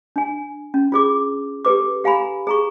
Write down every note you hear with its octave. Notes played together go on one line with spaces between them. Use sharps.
D4 G#5
C#4
F4 G#4 D6
G4 A4 B4 D6
G4 F5 G#5 A#5 B5
G#4 A#5 C#6